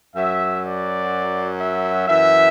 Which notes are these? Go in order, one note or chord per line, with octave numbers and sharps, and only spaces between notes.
F#2 F#3 E5
D5
E5
F#2 E3 E5